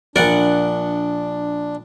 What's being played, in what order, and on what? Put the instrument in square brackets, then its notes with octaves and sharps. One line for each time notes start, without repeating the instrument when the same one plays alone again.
[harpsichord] A#1 A#4 [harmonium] D4 [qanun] D5 F#5